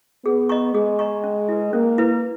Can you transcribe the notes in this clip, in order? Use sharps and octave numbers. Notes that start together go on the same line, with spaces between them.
B3 G#4
D#5 A#5 C#6
G#3 G#4
D#5 A#5 C#6
C#4
E4 B4
A#3 C#4
E4 B4